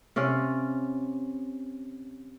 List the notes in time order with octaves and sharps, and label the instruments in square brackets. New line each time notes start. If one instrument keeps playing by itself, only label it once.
[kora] C3 C#4 D5 F5